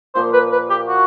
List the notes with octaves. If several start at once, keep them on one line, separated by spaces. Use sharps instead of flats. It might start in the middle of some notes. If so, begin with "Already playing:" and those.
A#2 F3 A#3 C5
B4
B4
G4
F#4